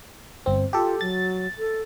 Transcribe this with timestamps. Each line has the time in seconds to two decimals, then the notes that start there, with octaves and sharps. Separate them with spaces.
0.46 G1 C4
0.73 F4 G4 A4
1.01 F#3 A6
1.59 A4